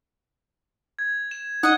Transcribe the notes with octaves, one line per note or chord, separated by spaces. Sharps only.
G#6
E7
D#4 D#5 F#5 D#6